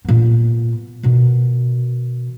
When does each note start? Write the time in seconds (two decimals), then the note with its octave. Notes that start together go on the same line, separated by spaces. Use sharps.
0.05 A#2 B3
1.03 B2 D#3